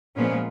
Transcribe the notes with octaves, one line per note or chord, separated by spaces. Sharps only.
A#2 F3 G#3 B3 C#4